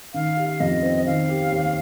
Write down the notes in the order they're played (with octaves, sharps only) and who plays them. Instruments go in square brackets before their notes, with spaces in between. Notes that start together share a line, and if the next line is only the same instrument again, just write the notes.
[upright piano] D#3 [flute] F5
[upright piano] G4
[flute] F5
[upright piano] F2 [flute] D#5
[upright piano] C4
[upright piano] D#3 [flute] F5
[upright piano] G4
D#2